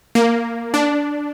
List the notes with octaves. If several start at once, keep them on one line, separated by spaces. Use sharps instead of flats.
A#3
D4